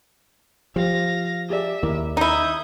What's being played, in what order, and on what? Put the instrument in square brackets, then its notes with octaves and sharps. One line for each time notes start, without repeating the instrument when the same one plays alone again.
[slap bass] F3 [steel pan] G4 C5 [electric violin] F5 A#6
[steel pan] G4 G#4 D5 [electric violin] E5
[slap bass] D#2 [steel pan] E4 A#4 D6
[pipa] D#4 E4 [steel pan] G#5 [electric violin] D#6 G6